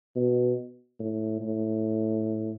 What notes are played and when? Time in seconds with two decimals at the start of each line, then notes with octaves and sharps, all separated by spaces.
0.16 B2
0.99 A2
1.41 A2